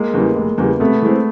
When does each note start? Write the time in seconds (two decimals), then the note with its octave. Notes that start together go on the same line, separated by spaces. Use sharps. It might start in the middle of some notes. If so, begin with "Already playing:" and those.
Already playing: G#3 A#3
0.14 E2 C#3 E3 G3
0.36 F1
0.58 E2 C#3 E3 G3
0.80 C3 A3 B3
1.02 E3 G#3 C4